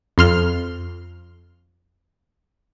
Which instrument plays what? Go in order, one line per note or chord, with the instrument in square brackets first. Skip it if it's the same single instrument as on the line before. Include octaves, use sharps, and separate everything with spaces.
[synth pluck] F2 C6 F6